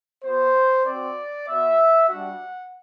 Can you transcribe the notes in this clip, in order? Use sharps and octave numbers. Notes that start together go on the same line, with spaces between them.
B3 F#4 C5
C4 F#4 D5
B3 F#4 E5
G3 D4 F#4 F#5